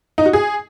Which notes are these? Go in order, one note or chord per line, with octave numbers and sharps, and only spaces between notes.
D#4
F#4
G#4